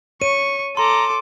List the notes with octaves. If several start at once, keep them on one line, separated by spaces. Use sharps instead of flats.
C#5 C#6 D#7
A4 A#5 C6 D6